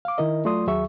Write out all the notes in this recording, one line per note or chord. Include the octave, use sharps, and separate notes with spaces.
F5 D6
D#3 E4 A#4 D#5
F#3 A3 F4 D5 C6 D#6
D#2 F#3 G#4 E5 C#6